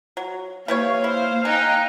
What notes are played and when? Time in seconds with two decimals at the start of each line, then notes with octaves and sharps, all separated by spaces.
0.17 F#3
0.68 E3 G3 A#3 C#5 F5
1.04 E4 C5
1.45 D#4 G5 G#5 F#6